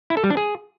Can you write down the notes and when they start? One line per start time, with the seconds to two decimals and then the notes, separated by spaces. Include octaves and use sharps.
0.10 E4
0.17 A4
0.24 G3
0.30 D4
0.37 G#4